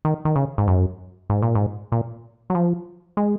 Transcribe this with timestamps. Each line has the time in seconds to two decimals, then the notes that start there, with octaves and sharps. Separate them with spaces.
0.05 D#3
0.25 D#3
0.36 C#3
0.58 G#2
0.67 F#2
1.30 G#2
1.42 A#2
1.55 G#2
1.92 A#2
2.50 F#3
2.55 F3
3.17 G#3